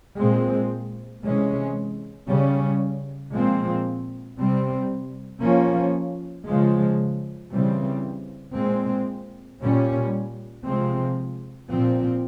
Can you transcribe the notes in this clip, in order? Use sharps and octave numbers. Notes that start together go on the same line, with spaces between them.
A#2 G#3 C4
C3 E3 G#3 C#4
C#3 G3 C#4
A#2 F3 G#3 C4
C3 G3 C4
F3 A#3 C#4
C#3 F3 G#3
C#3 E3 G3 C4
A#2 G#3 C4
A#2 G3 C#4
C3 F3 G#3 C4
A#2 F3 C4